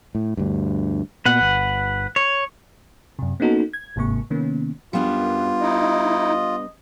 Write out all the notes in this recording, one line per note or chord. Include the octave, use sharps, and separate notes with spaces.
A2
D2 G2
A#2 B3 B4 F#5
G1
C#5
F#2 C3
A#3 B3 C#4 D#4 F#4 A4
G#6
G1 G#2 C3 A#3 C#6
C3 D#3 A#3 B3 C#4
F#2 G3 B3 D4 F4
D#4 E4 D#5